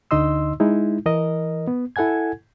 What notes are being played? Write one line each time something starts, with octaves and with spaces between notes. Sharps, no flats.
D2 D3 D#4 D#5 C6 E6
G#3 D#4 E4
E3 A#4 D#5
B3
E4 A4 F#5 G#5 G#6